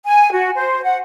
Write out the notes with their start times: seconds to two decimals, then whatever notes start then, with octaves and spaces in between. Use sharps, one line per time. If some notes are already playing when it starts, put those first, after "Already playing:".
0.05 G#5
0.32 F#4
0.56 C5
0.84 F#5